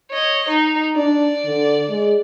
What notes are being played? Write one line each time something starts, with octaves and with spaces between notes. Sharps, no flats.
C#5 D#5
D#4
D4 D5
D3
G#3